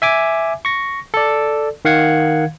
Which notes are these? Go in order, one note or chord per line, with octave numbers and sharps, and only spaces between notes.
E5 G#5 D6
C#6 A#6
A4 D5
D#3 F5 F#5 G#6